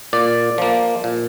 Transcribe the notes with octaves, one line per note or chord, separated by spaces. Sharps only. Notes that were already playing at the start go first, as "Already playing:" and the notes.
A#2 D5
F3 A#3
A#2